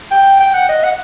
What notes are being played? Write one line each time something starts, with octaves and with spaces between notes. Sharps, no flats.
G5
G5
F#5
D#5
F#5